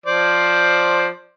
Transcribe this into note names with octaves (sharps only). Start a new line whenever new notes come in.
F3 C5 D5